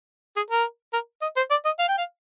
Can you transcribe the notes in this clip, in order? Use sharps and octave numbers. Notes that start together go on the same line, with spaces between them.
G#4
A#4
A#4
D#5
C5
D5
D#5
F5
G5
F5